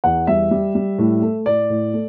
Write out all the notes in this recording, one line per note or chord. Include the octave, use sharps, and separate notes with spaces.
E2 F#5
G3 E5
G3
G3
A2
A3
A2 D5
A2
A3